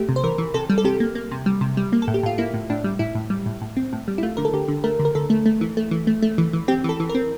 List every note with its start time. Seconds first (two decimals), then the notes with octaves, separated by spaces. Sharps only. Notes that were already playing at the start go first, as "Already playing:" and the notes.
Already playing: A3 G4
0.09 C3
0.16 C5
0.24 E3 A#4
0.38 E3
0.54 C3 A4
0.69 G3
0.78 A4
0.84 C3 G4
1.00 A#3
1.15 A#3
1.31 C3
1.46 G3
1.61 C3
1.77 G3
1.93 A#3
2.02 A4
2.08 A2
2.14 G4
2.23 A2 F4
2.38 A#3 E4
2.54 A2
2.70 A2 D4
2.84 G3
2.99 A2 E4
3.15 A2
3.30 G3
3.46 A2
3.62 A2
3.77 C4
3.93 A2
4.08 G3
4.18 E4
4.23 A3 F4
4.37 D3 A#4
4.45 A4
4.53 D3 G4
4.68 D3
4.84 A3 A#4
5.00 D3
5.05 A#4
5.15 D3 A4
5.30 A3
5.46 A3
5.61 E3
5.77 A3
5.91 E3
6.07 A3
6.22 A3
6.38 E3
6.53 E3
6.68 C4 G4
6.84 E3 A4
7.00 E3
7.09 A#4
7.15 C4